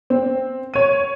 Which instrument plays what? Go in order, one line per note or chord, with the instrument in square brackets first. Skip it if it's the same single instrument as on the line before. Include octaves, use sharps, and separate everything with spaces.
[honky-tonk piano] C4
C#5 D#7